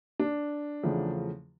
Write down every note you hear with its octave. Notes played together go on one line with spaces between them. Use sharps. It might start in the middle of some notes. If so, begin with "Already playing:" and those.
D4
E2 C#3 F3 A3